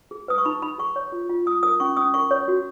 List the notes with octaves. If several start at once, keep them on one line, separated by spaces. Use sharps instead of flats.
G#4
B4 D#6
C#6
D#4 B5
D#4 B5
G#4 C#6
C#5
F4
F4
F4 D#6
A#4 D#6
C#4 C#6
C#4 D#6
A#4 C#6
C#5
F#4